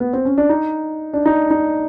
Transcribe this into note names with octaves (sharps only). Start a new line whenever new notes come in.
B3
C4
C#4
D4
D#4
D4
D#4
D#4